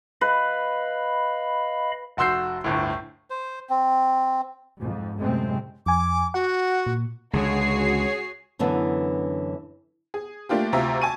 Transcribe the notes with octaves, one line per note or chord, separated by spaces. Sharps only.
B4 D#5 F5 B5
F1 F#4 C6 E6 G6 C7
G1 D2 A2
C5
C4
F2 G#2
F#2 A2 C3 G#3 A3 C4
F2 G#5 D6
F#4 F#5
A#2
C#2 D3 F#4 G#4 C#5 C7
F#2 D3 E3 B3 D4
G#4
A3 A#3 D4 F4 G4
D2 C3 F4 E5 A#5
G#5 A5 C#6 D#7